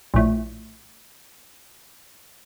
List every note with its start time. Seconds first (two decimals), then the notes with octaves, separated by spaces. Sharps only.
0.14 A#1 A2